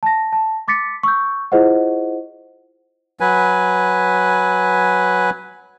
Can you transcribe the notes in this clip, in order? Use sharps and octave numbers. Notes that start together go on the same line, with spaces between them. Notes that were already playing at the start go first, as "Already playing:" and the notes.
A5 A#6
A5
C6 D6 A6 B6 C#7
C#6 E6 G6
E4 F4 G#4 C5 D#5 F#5
F#3 B4 G#5